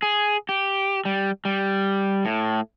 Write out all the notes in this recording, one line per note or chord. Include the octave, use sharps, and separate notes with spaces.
G#4
G4
G3
G3
A2